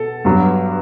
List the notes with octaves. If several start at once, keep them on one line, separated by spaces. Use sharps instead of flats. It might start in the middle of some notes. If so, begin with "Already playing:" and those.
Already playing: B2 A4
G2 F#3 B3